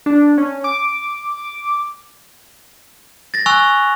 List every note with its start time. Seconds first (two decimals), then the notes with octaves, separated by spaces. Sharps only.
0.06 D4
0.38 C#4
0.64 D6
3.34 A6 A#6
3.46 G#5 C#6 E6 F#6 F7